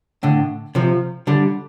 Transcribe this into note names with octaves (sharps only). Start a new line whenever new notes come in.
A2 D3
C3 F3
D3 G3